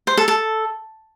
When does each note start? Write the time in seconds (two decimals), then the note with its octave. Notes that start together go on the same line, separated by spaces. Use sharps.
0.07 C5
0.17 A4
0.28 A4